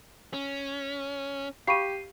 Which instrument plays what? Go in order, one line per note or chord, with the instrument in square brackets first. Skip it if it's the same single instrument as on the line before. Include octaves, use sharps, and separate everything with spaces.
[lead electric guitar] C#4
[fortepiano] G4 [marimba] F5 B5 C#6 [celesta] C7 D#7